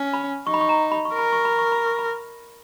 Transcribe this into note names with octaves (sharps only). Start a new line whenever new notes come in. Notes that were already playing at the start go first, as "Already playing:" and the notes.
Already playing: C#4
B5
D#4 C#6
B5
C#6
A#5
B5
C#6
A#4 B5
C#6
B5
C#6
B5
C#6
B5